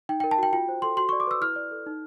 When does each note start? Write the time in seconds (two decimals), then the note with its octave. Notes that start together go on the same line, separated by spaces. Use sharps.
0.09 D#4 G5
0.20 A#4 G5
0.31 A5
0.38 F#4 G5
0.53 F4 G5
0.69 C5
0.82 A4 C6
0.97 F#4 C6
1.09 D5 C#6
1.20 D6
1.27 B4 E6
1.41 E4 F6
1.56 D5
1.71 A4
1.86 D#4